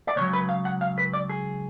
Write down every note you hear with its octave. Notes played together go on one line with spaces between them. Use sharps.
D5
C#2 C#3 F#3 C#5
B4
F5
F#5
F5
B4
D5
G#4